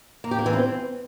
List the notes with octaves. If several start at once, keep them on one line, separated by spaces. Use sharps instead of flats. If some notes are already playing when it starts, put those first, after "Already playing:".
A#3
G4
A#3
E3
C4